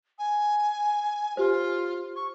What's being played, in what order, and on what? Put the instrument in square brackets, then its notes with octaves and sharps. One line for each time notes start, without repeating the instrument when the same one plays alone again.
[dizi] G#5
[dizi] F4 [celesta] G4 C5
[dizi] C#6